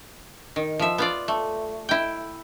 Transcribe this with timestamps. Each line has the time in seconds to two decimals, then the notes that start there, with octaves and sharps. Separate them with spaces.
0.56 D#3
0.79 F3 E5
0.98 B3 F4 D5
1.28 A3
1.89 E4 G5